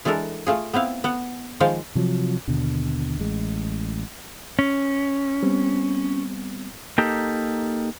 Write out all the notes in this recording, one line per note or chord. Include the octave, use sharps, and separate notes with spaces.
E3 G#3 D4 A4 A#4
A3 F4 G#4
B3 C4 E4 F5
B3 F#5
D#3 F3 G#3 C5 F5
C3 F3 F#3
D#2 B2 D3
A1 G#3
C#4
G3 B3 C4
A#3 D#4 G4 A4